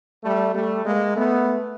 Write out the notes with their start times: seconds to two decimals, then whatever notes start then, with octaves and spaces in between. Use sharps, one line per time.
0.23 G3 A3
0.54 G3 A3
0.84 G#3 A#3
1.15 A3 B3